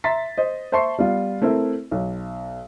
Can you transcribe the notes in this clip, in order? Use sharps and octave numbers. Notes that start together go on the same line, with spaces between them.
E5 A#5 C6 A6 B6
C5 D#5
C5 E5 A5 C6 C#6 C7
G3 B3 F4
A3 C4 E4 A#4
B1